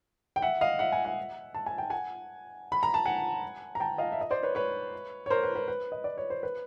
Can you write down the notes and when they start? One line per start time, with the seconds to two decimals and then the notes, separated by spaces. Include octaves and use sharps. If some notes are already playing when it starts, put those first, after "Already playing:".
0.36 G5
0.42 E5 F#5
0.61 D#5 F5
0.79 E5 F#5
0.92 F#5 G#5
1.05 E5 F#5
1.54 A5
1.66 G#5
1.78 G5
1.90 F#5 G#5
2.72 B5
2.83 A#5
2.94 A5
3.06 F#5 G#5
3.75 A#5
3.80 G5 A5
3.98 D#5 F5
4.12 E5
4.21 D#5
4.31 C5 D5
4.43 B4 C#5
4.55 B4 C#5
5.26 C#5
5.30 A#4 C5
5.43 B4
5.55 B4
5.68 B4
5.92 D#5
6.04 D5
6.18 C#5
6.30 C5
6.43 B4